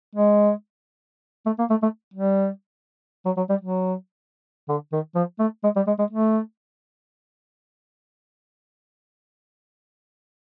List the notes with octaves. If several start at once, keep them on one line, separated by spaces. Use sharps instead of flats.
G#3
A3
A#3
A3
A3
G3
F#3
F#3
G3
F#3
D3
D#3
F3
A3
G#3
G3
G#3
G#3
A3